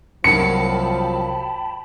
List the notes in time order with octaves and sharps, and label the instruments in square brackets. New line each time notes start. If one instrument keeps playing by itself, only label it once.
[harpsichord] C2 A#2 F#3 [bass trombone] F3 [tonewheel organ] G5 A5 B5 [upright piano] C#7